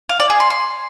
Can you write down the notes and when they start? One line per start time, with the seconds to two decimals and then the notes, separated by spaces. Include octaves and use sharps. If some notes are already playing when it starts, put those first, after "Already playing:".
0.09 F5
0.20 D5
0.30 G#4
0.40 C6
0.50 C6